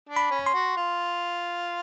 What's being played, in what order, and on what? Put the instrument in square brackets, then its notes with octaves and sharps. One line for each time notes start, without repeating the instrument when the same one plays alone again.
[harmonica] D4
[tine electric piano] B5
[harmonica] C#4
[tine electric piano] C6
[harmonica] F#4
F4